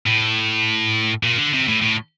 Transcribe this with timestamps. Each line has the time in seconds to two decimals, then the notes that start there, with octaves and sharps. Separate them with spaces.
0.06 A2
1.23 A#2
1.37 D3
1.53 C3
1.68 A2
1.81 A2